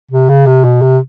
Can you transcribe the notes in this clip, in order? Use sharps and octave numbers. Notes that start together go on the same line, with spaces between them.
C3
C#3
C3
B2
C3